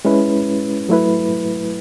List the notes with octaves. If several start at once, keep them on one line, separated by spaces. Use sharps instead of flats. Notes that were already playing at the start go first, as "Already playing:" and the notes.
G#3 C#4 E4 B4
F#3 A3 E4 B4